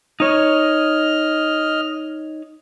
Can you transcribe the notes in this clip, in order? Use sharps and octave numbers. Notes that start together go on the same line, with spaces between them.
D#4 C#5 D#5 F6